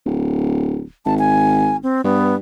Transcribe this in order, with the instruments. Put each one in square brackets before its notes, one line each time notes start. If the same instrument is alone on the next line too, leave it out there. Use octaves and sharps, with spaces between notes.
[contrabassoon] D1
[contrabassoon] G#1 [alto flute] A5
[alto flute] G#5
C4
[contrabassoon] G2 [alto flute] B3